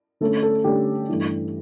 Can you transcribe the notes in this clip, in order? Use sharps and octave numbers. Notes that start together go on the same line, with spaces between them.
D3 A3 C#4 A4
A4
D3 A3 C#4 G4
G2 E3 A3